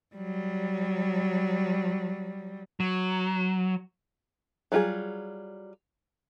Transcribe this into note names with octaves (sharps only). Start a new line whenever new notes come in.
F#3 G3
F#3
F#3 G3 F4 F#4 G#4